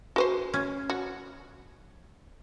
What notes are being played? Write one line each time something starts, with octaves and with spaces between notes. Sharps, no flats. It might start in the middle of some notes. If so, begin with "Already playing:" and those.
F#4 B4 C5
C#4
F#4